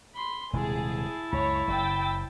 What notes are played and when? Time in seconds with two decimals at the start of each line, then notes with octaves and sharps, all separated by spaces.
0.15 B5 C6
0.53 D#1 C3 G#3 E4 G#4 A5
1.33 C#2 F#2 C#5 B5
1.67 F#1 C#3 G5 E6 A6